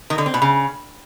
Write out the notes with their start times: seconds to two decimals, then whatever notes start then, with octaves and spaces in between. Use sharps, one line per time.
0.10 D#3
0.18 D3
0.26 C4
0.34 B2
0.42 C#3